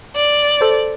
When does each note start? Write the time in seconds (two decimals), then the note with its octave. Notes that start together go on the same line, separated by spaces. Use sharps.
0.16 D5
0.61 A4 C5